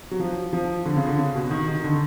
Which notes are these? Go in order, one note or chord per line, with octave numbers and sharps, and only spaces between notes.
F#3
F3
F3
D3
C#3
D3
C#3
B2
D#3
D#3
D3